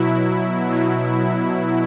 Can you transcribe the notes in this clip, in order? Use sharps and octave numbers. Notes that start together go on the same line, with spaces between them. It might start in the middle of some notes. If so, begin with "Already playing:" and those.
Already playing: B2 F#3 E4
B2 F#3